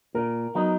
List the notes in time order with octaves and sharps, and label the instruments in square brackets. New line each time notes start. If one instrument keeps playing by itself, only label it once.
[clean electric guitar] A#2 [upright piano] A#4
[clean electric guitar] F#3 B3 D#4